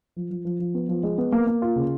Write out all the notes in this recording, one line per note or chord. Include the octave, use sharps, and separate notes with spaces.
F3
F3
F3
F3
B3
F3
G#3
B3
A#3
A#3
F4
C#3